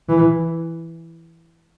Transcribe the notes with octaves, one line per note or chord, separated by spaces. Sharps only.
E3